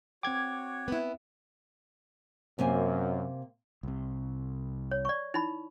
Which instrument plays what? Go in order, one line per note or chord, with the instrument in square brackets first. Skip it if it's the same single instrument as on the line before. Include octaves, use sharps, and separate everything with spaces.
[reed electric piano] C4 G5 [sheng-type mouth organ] F#4 C#5 [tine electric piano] D6 G#6
[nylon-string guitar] B3 E4
[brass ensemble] F#2 [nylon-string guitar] C3 A#3 G#5
[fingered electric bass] C2 C3
[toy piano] C#5
D5 C#6
D#4 E4 B5